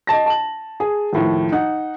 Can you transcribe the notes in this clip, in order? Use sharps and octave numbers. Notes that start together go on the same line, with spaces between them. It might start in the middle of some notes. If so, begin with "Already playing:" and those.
D#5 A5 A#6
A5 F#7
G#4
D#2 A2 F3
D#4 F#5